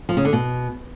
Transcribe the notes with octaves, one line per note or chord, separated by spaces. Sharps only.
F3
C#3
D3
B2